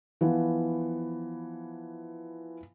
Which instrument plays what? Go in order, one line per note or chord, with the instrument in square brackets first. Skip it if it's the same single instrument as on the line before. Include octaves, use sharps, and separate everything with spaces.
[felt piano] E3 F3 B3